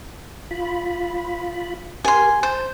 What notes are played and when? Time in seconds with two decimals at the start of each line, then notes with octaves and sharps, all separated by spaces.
0.51 F4 B5
2.04 G4 A#4 G#5 C6
2.43 C5 A5